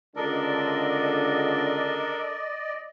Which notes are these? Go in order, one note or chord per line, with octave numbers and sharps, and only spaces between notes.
C#2 D3 D4 A4 A#4 D5 D#5